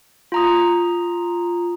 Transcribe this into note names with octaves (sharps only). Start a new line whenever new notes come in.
F4 A#5 D#6